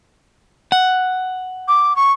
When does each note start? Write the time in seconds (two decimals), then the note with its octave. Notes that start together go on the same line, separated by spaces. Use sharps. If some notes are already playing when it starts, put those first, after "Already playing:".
0.72 F#5
1.68 D6
1.96 C#6